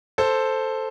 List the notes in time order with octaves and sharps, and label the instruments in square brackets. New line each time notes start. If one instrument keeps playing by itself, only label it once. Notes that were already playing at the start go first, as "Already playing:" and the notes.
[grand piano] A4 C5